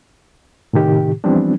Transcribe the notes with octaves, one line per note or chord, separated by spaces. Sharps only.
A2 C3 D#3 G4
E3 F3 G3 B3 C4 D4